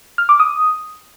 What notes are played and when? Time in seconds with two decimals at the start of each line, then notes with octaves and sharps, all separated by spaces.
0.18 F6
0.29 D6
0.40 D#6